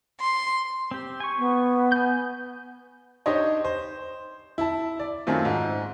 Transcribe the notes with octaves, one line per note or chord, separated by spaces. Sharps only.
C6
C4 G4
G#5 C#6
B3
G#5 G6
D4 D#4 G4 C5 C#5 D#5
C5
E4 A5
D5
F#2 D#3 A3 C4 F4
G#2